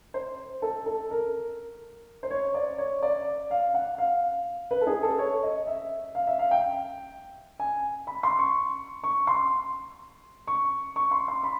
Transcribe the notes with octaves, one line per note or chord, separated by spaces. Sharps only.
C5
A4
A4
A#4
C5
C#5
D5
C#5
D5
F5
F#5
F5
B4
A4
G#4
A4
C#5
D#5
E5
F5
E5
F5
G5
G#5
B5
C6
C#6
C#6
C6
C#6
C#6
C6
C6
B5